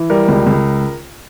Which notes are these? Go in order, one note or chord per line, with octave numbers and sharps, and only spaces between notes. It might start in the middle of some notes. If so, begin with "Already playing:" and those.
Already playing: E3
G3 A#4
C#2
C#2